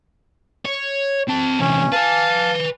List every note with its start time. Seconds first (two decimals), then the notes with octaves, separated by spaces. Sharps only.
0.65 C#5
1.29 C4 A5
1.60 E2 C3 C#4
1.92 B4 F5 G#5 A5